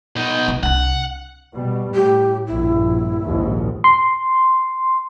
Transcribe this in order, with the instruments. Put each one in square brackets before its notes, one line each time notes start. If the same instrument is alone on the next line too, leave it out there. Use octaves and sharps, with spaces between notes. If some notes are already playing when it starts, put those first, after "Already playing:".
[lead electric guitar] B2 D#4
[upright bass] C2 E4
[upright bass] C2 D4 [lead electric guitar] F#5
[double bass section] B2 G3
[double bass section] A2 [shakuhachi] G4
[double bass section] A#1 G2 [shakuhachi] E4
[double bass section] A#1 D#2 G#2
[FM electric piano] C6